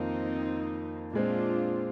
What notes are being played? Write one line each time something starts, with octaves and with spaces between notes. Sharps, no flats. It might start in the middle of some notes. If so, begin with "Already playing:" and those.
Already playing: F2 D#3 A#3 C4 D#4
A#2 G#3 C4 D4 F4